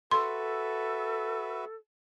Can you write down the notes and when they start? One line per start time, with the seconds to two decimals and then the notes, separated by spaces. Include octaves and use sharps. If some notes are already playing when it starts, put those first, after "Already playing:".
0.11 F#4 A4 B4 E5 C6